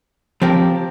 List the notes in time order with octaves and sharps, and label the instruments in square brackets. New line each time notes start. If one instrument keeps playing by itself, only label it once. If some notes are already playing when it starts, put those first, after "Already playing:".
[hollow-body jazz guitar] F3 C4 G4 A#4